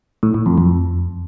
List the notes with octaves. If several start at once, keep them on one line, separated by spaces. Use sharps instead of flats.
A2
A2
F2
F2